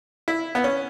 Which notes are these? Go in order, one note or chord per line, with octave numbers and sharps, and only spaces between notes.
E4
B3
C#4